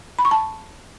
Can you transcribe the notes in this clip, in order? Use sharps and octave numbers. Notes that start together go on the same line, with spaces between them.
B5
C#6
A5